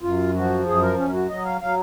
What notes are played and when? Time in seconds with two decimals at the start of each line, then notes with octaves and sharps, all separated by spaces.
0.02 F#2 F4
0.34 F3 F#4
0.66 F#2 G#4
0.81 A#4
0.97 F#2 C#4
1.13 F#4
1.29 F#3 D#5
1.45 F5
1.61 F#3 F5